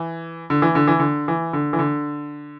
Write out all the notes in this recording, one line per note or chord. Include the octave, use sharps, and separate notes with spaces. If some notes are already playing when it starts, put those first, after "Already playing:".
Already playing: E3
D3
E3
D3
E3
D3
E3
D3
E3
D3